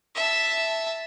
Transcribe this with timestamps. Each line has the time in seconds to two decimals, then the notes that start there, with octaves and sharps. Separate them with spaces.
0.15 E5 A5